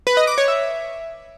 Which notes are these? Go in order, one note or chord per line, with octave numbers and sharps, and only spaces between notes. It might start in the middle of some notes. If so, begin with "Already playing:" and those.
B4
D#5
D6
C#5
E5